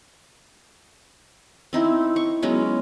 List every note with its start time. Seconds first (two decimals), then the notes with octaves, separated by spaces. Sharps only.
1.73 C4 D#4 E4
2.16 C#6
2.42 F#3 G#3 B3 C#4